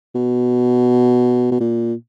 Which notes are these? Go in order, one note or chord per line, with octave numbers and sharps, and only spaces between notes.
B2
B2
A#2